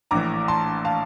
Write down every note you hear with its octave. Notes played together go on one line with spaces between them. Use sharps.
A#1 A2 E3 A#5 D6
A5 C6
F5 A5